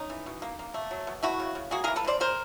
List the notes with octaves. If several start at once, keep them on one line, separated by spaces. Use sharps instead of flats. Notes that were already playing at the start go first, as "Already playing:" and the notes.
Already playing: C#4 D#4
E3
B2
A#3
A#3
A3
F#3
B2
A3 E4 F#4
C#3
C#3
A#3 F#4 G#4
G#4 A#4
E3
A4 B4
E3
C5 D5
G#3 A#4 C5